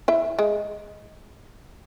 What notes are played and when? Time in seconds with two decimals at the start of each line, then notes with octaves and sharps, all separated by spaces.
0.08 E4 E5
0.39 G#3